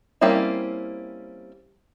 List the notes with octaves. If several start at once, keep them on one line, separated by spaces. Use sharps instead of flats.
G3 A#3 C4 C#4 E4